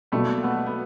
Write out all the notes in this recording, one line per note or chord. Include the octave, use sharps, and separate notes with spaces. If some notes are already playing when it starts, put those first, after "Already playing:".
B2 F#3 G3 A3 A#3
A3 B3
B3